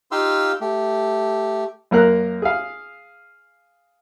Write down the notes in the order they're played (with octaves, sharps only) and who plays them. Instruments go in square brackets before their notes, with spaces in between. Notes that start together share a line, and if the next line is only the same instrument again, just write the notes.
[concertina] D#4 F4 G4 F5 C6 E6
A3 G4
[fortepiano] F#2 A#3 A#4 F#6
G#4 F5